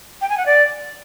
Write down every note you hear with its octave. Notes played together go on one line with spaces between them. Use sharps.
G5
G#5
F#5
D5